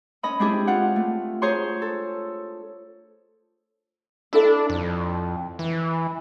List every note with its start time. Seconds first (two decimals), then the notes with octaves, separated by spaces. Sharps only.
0.23 C#4 D#5 B5
0.39 G#3 C4 D4 E4 G4 G#4
0.67 D4 F4 F#5
0.96 A3
1.42 G#4 C5 C#5 A#5 C6
1.82 A4
4.33 D4 E4 A4 D5
4.70 F2
5.59 E3